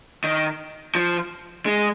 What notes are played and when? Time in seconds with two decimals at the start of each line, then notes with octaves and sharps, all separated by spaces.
0.24 D#3
0.95 F3
1.66 G#3